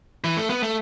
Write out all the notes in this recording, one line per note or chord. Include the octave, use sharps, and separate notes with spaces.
E3
A3
B3
A3